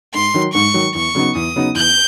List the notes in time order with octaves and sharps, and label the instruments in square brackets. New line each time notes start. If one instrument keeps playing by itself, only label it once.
[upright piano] G#2 [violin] C6
[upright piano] D#3 F#3
[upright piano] G#2 [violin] C#6
[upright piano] D#3 F#3
[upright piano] E2 [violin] C#6
[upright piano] C#3 F#3 B3 D#4
[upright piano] E2 [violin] D#6
[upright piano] C#3 F#3 B3 D#4
[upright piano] E2 [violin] G6